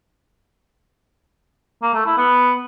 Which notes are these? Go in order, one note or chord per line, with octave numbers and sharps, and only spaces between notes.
A#3
A3
E4
B3